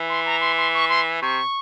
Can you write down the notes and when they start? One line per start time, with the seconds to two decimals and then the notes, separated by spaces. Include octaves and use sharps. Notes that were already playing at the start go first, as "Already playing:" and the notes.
Already playing: E3
0.09 C6
0.26 A#5
0.41 C6
0.57 C6
0.74 C#6
0.89 C6
1.22 C3 C#6